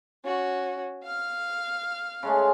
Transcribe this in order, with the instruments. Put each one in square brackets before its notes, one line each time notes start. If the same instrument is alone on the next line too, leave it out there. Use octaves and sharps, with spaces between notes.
[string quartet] C#4 F#4
F5 F6
[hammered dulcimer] C#3 G#3 A3